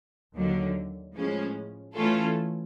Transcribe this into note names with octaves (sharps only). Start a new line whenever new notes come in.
D#2 D3 F#3
A2 F3 G#3 C#4
E3 A3 C#4 F4 A4